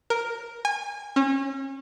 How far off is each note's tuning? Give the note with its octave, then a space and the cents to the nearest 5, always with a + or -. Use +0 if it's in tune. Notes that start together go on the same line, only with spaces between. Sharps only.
A#4 +0
G#5 -25
C#4 -30